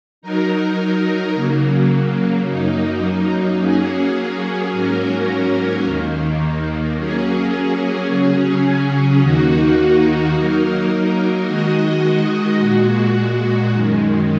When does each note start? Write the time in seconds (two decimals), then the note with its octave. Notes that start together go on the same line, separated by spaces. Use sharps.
0.22 F#3 D#4 A#4
1.35 C#3 F#3 A#3
2.47 F#2 F#3 A#3 D#4
3.59 F#3 A#3 C#4 G#4
4.72 G#2 F#3 A#3 C#4 A#4
5.84 D#2 D#3 A#3
6.97 F#3 A#3 C#4 G#4
8.09 C#3 F#3 C#4 G#4
9.21 D#2 D#3 A#3 D#4 F#4
10.34 F#3 A#3 D#4 A#4
11.47 D#3 G#3 F#4 D#5
12.58 A#2 G#3 F#4
13.71 F#2 D#3 G#3